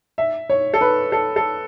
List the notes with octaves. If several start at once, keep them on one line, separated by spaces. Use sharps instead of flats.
E5
C#5
A4
B4
A4
A4